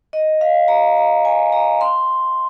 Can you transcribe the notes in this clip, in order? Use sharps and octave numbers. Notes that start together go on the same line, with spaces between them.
D#5
F5
A#5
A#5
G#5
A#5
C6